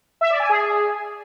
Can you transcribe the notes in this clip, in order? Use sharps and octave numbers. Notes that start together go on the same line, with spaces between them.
E5
D5
G#5
G#4